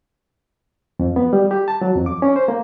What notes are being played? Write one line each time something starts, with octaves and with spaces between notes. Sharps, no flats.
F2
B3
G3
G4
A5
F#3
F2
D6
C#4
C5
A#3